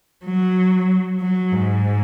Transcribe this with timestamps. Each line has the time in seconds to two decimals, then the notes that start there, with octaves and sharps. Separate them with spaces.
0.25 F#3
1.20 F#3
1.52 G#2